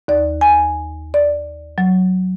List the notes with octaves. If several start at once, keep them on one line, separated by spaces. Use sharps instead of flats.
D#2 D5
G#5
D5
F#3